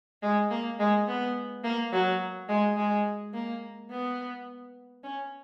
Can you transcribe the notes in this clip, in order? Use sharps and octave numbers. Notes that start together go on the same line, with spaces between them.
G#3
A#3
G#3
B3
A#3
F#3
G#3
G#3
A#3
B3
C#4